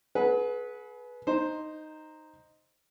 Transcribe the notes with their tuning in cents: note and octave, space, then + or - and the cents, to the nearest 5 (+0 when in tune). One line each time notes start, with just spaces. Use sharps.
G#4 +35 B4 -10 F#5 +0
D#4 -5 C5 +0